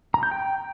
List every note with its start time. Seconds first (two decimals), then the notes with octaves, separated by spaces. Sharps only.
0.14 A#5
0.23 G6
0.31 G5